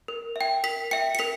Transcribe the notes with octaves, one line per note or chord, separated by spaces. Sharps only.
A#4
E5 G5
A#4 B6
E5 G5 C#7
C#7
A#4 B6